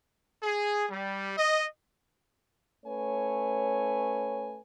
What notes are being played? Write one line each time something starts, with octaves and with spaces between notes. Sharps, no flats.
G#4
G3
D#5
A3 C#4 B4 C#5 G#5